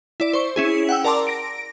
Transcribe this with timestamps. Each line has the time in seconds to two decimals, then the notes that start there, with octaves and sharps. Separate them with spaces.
0.20 E4 D5
0.33 C5 C#6
0.56 C#4 E4 G#4
0.89 F#5 G5 E6
1.04 A#4 D5 A5 A#5 C6 D6
1.27 A#6 D7